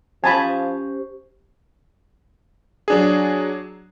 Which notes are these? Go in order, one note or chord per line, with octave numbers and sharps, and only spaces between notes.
F3 C#4 G4 C5 G#5 A5 B5
F#3 D4 G#4